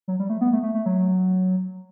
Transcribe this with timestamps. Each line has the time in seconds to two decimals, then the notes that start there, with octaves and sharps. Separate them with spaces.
0.08 F#3
0.19 G3
0.30 A3
0.41 B3
0.53 A3
0.63 A3
0.74 A3
0.86 F#3